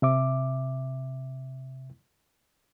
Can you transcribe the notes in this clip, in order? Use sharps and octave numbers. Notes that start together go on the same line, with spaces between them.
C3 E5 D6